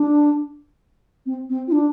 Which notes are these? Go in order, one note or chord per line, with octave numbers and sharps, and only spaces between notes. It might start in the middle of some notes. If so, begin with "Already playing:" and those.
Already playing: D4
C4
C4
F4
D4